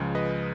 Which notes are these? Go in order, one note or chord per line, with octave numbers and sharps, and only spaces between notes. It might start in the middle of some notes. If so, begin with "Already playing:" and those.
Already playing: C#2 C#3 F3 G#3
B4 D#5